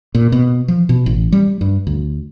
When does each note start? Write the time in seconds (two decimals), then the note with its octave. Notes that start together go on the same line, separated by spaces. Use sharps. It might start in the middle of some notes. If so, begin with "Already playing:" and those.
0.15 A#2
0.32 B2
0.68 F3
0.89 B2
1.06 A1
1.32 G3
1.61 G2
1.87 D2